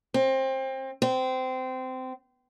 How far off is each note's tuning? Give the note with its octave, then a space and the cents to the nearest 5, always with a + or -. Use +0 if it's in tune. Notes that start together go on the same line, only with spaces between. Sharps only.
C4 +25
C4 -20